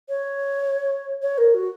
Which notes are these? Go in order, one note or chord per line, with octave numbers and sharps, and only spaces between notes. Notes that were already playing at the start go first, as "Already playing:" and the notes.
C#5
C#5
A#4
F#4